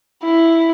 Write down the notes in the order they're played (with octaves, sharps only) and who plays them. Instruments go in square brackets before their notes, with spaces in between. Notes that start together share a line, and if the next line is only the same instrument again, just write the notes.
[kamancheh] E4